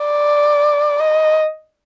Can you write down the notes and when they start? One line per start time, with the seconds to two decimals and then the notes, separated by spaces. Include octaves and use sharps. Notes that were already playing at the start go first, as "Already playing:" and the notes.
Already playing: D5
0.99 D#5